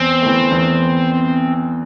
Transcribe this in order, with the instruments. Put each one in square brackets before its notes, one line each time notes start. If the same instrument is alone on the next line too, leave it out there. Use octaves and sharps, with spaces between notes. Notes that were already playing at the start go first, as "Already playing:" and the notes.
Already playing: [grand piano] E2 [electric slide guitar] C4
[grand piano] E3 A3
E2